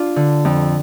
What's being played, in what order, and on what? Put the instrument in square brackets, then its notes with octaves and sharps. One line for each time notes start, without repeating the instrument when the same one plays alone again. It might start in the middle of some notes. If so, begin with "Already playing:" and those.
Already playing: [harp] D4 F4
D3
F2